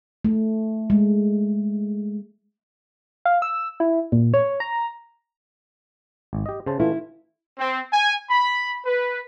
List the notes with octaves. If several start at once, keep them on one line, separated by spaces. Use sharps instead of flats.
A3
G#3
F5
E6
E4
A#2
C#5
A#5
G#1
G4 D#5
C#3 C5 A5
E3 A3 E4 F4
C4
G#5
B5
B4